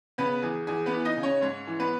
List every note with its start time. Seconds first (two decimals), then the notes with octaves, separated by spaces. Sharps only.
0.18 C#3 B3 B4
0.42 E2 G#4
0.67 E2 G#4
0.86 B3 B4
0.93 E3
1.05 D#4 D#5
1.17 C#3
1.23 C#4 C#5
1.41 G#2 C#4 C#5
1.67 E3
1.79 B3 B4